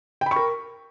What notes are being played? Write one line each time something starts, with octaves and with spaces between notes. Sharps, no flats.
A#4 G5 B5 C#6